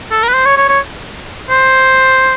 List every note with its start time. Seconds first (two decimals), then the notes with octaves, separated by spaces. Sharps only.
0.11 A4
0.23 A#4
0.29 B4
0.34 C5
0.46 C#5
0.57 C#5
0.69 C#5
1.50 C5